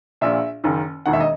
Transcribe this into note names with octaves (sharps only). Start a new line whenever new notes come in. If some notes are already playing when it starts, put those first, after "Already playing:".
A#1 A#2 E5
F#1 F#2 D#3
E1 D#2 D#3 F#5
E5
D#5